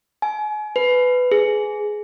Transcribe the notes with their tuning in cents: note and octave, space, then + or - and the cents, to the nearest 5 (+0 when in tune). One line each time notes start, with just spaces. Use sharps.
G#5 +35
B4 +15
G#4 +15